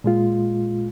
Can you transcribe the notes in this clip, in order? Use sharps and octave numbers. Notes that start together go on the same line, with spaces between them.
A#2 G#3 F4